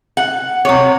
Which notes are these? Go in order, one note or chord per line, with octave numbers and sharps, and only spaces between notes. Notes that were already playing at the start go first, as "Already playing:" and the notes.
F#5
C3 C#5